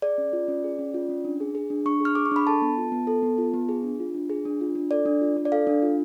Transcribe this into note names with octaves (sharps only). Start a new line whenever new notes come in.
G#4 D5
C#4
F4
C#4
G#4
C#4
F4
C#4
D4
G#4
G#4
D4
D4 C#6
G#4 F6
G#4 D6
C#6
D4 B5
A4 A5
B3
F4
B3
A4
B3
F4
B3
G#4
D4
F4
D4
G#4
D4
F4
D4
A4 D5
D4
F4
D4
D5
A4 F5
D4
F4